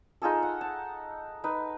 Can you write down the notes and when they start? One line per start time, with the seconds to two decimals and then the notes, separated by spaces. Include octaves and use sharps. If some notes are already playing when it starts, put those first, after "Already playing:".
0.22 D#4 F4 G#4 A4
0.43 F#5
0.61 A5
1.44 D#4 B4